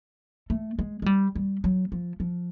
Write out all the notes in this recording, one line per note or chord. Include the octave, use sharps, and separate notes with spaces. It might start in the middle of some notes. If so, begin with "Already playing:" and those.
A3
G#3
G#3
G3
G3
F#3
F3
F3